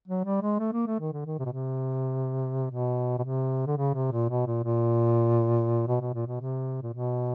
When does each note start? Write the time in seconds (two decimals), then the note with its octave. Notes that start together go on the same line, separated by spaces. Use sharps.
0.08 F#3
0.25 G3
0.42 G#3
0.59 A3
0.73 A#3
0.87 A3
1.00 D#3
1.13 D3
1.26 D#3
1.39 C3
1.45 B2
1.52 C3
2.71 B2
3.19 B2
3.23 C3
3.67 D3
3.77 C#3
3.94 C3
4.12 A#2
4.30 B2
4.47 A#2
4.64 A#2
5.88 B2
6.01 B2
6.14 A#2
6.27 B2
6.41 C3
6.82 A#2
6.94 B2